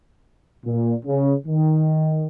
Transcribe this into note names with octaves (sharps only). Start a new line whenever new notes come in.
A#2
C#3
D#3